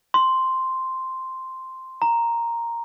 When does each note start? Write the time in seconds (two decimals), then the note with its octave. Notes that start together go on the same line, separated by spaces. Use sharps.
0.14 C6
2.02 A#5